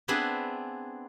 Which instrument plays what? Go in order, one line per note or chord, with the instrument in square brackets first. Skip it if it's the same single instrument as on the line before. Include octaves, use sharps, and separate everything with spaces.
[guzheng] B3 C4 D4 G#4 E5 A5